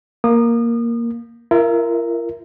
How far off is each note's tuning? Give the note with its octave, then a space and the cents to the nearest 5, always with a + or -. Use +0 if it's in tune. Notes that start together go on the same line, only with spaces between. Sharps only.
A#3 +0 D#6 -30
F4 -45 A#4 +0 E5 -10